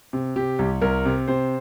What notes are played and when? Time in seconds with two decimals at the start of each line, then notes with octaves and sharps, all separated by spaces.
0.13 C3
0.36 C3 G4
0.59 C2
0.81 C2 A#4
1.06 C3
1.28 C3 C5